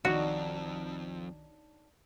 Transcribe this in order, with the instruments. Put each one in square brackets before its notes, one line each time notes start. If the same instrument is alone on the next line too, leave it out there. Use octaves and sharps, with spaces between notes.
[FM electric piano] B1 D#3 [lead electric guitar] F2 [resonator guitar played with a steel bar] D4 D#4 C#5 [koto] F#4